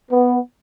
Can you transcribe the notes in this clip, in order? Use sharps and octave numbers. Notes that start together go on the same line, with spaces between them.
B3